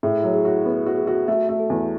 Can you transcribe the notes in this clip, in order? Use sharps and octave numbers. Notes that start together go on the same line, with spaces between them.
A2 G#4
F#3
G#4
F#4
B3
F#4
G#4
F#4
A3 F#4
A3
A4
E2